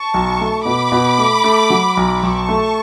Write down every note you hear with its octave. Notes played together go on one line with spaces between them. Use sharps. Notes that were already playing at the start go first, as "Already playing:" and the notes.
Already playing: A5 C#6
B1
A3
B2 B5 D6
B2
A3
A3
F#3
B1
B1 A5 C#6
A3